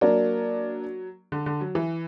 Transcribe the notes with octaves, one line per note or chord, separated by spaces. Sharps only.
F#3 A#3 D4 A#4 D5
D3
D3
F#3
E3